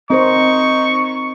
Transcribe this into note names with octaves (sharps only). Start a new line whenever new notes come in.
C4 D#4 A#4 C5 C#6